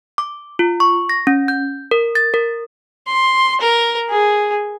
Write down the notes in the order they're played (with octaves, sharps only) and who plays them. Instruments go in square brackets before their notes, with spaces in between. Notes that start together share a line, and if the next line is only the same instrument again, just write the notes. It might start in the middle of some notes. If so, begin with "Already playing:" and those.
[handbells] D6
F4
C#6
A#6
C#4
G6
A#4
A6
A#4
[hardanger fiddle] C6
A#4
G#4